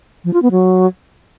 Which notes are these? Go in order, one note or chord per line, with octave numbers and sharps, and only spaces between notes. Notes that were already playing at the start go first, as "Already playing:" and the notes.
F3
F4
B3
F#3